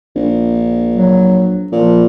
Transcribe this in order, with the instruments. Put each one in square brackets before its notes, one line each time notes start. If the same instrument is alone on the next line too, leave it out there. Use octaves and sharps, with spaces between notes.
[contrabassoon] A#1
[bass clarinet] F#3
[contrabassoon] A#2 [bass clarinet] F3